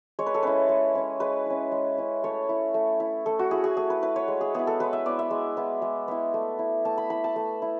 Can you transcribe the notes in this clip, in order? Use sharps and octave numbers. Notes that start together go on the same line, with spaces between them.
G#3 C#5
B4
A4
C#4 E4 B4
G#3
C#4 E4
G#3 B4
C#4 E4
G#3
C#4 E4
A3 C#5
E4
A3
E4
A3 A4
F#4
E4 G#4
G#4
A3 G#4
B4
E4 B4
C#5
G#3
G#4
B3 E4 G#4
A4
G#3 B4
E5
B3 E4 D5
E5
G#3
B3 E4
G#3
B3 E4
A3
E4
A3 A5
B5
E4 B5
A5
A3
E4